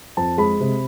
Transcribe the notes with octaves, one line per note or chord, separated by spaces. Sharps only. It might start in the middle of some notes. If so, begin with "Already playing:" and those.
F2 A5
G#3 B5
C3